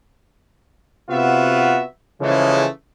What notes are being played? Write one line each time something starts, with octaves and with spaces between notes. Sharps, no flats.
C3 B3 F4 F#4 E5
C#3 E3 F3 G#3 A3